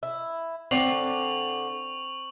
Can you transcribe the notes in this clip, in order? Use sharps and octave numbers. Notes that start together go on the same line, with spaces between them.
E4
D3 C4 D5 C#6 C7 F7 F#7